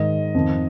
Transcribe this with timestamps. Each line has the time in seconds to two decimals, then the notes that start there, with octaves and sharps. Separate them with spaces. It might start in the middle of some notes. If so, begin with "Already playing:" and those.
Already playing: G#2 D#3 D#5
0.35 F2 D#3